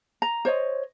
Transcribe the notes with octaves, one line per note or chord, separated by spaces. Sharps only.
A#5
C5 C#5 D#5